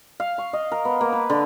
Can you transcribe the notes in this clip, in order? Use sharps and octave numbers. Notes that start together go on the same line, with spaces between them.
F5
C#6
D#5
A#4
B3
A#3
B4
D3